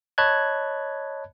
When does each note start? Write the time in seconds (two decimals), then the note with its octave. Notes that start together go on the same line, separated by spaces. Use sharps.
0.18 C#5 D#5 A5 B5 F#6 G#6